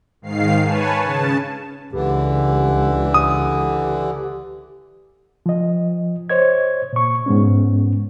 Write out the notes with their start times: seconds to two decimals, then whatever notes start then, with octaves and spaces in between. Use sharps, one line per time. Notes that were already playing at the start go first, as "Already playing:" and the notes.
0.22 G#2 D#3 F5 C7
0.64 B4 C#5 G#5 A5
1.03 C#3 A5
1.92 C#2 D3 E3 G4
3.14 D#6
5.46 F3 D#5
6.30 C5 C#5 D#5 G#6
6.93 A#2 C#6
7.26 G#2 G#3 B3 C#4